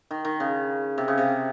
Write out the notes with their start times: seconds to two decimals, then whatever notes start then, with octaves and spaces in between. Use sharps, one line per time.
0.11 D#3
0.25 D#3
0.40 C#3
0.98 C3
1.08 C#3
1.18 C3